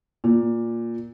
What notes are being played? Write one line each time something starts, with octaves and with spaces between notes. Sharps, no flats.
A#2